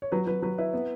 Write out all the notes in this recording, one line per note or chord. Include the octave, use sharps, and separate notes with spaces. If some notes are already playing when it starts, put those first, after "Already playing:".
C#5
F#3 B4
F#3 B4
F#3 B4
E4 B4
B3